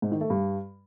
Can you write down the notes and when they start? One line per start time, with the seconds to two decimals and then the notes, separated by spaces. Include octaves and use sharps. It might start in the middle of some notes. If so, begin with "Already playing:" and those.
0.02 G#2
0.12 D#3
0.21 A3
0.30 G2